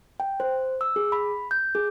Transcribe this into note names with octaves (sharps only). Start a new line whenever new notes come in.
G5
C5
E6
G#4
B5
G6
G#4